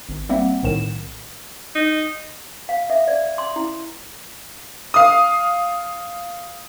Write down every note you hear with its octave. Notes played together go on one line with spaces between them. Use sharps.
G#1
G3 A#3 C4 E5 F#5
B1 A2 D#3 E7
D#4
F5
E5
D5
C6
E4
F5 D#6